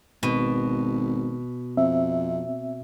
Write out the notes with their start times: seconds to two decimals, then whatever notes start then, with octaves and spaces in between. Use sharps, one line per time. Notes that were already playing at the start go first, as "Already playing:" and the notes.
0.23 G#1 B2
1.77 F2 C4 E5